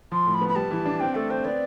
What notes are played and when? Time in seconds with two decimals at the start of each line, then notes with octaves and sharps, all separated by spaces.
0.12 F3 C6
0.26 A2
0.34 B5
0.41 B3
0.48 B5
0.55 G3 A5
0.71 E3
0.85 D4
1.00 C4 G5
1.15 A3 A4
1.30 C4 C5
1.44 B3 D5